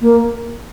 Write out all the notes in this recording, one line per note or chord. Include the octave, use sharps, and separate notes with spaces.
A#3